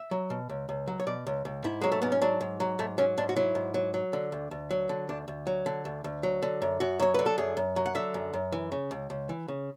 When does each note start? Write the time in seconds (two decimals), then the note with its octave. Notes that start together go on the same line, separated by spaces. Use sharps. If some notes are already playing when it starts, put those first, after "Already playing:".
Already playing: E5
0.11 F#3
0.30 B2
0.49 C#2
0.69 C#2
0.88 F#3
1.00 C#5
1.07 B2 D5
1.27 C#2
1.45 C#2
1.64 G#2 E4
1.81 F#3 G#3
1.92 A3
2.02 G#2 B3
2.12 C#4
2.22 F#3 D4
2.41 G#2
2.60 F#3
2.79 G#2 A3
2.98 F#3 C#4
3.18 G#2 D4
3.29 F#4
3.36 F#3 E4
3.55 G#2
3.74 F#3
3.94 F#3
4.13 D3
4.32 D2
4.51 D2
4.71 F#3
4.89 D3
5.09 D2 D4
5.28 D2
5.47 F#3
5.66 D3
5.85 D2
6.04 D2
6.23 F#3
6.42 D3
6.62 F#2
6.80 F#2 F#4
7.00 F#3 C#5
7.14 D3 B4
7.26 A4
7.38 F#2 G#4
7.57 F#2
7.76 F#3
7.86 F#5
7.95 D3 E5
8.14 F#2
8.34 F#2
8.52 E3
8.72 C#3
8.91 C#2
9.10 C#2
9.29 E3
9.48 C#3